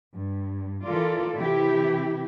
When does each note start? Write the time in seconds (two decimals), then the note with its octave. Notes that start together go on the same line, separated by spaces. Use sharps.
0.15 G2
0.85 E3 F4 A4 A#4 D5
1.36 C3 E3 E4 G4